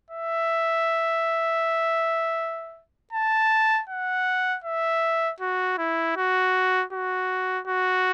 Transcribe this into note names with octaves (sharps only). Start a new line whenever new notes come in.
E5
A5
F#5
E5
F#4
E4
F#4
F#4
F#4